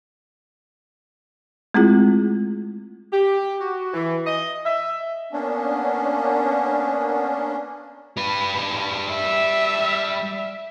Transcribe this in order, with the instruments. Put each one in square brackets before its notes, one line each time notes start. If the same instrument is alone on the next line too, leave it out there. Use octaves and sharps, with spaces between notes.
[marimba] G#3 A3 C4 E4 F4 G#4
[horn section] G4
F#4
E3
D#5
E5
[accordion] A#3 B3 C#4 D4
[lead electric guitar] G3 B4
[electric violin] E5